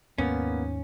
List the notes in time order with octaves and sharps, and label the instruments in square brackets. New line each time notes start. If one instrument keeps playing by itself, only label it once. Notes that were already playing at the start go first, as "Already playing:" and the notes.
[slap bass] D#2 G#2 [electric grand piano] A#3 B3 [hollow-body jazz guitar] C#4